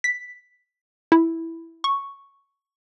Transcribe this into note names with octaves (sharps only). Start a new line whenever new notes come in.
B6
E4
C#6